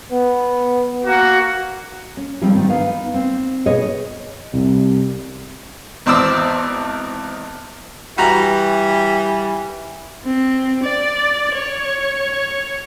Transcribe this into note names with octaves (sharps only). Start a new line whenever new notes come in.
B3
A#3 F#4
C#4
F3 G3 G#3 C4 D#4
G#2 D#3 C4 D4
B3 D#4 F5
C4
B2 G#4 C#5 D#5
C2
G#1 E2 C5 D5 D6 E6
E3 G3 F#4 A#5
C4
D5
C#5